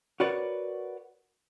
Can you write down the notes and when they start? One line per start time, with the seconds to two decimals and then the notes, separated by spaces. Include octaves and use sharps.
0.20 F#4 A#4 B4 C#5 D5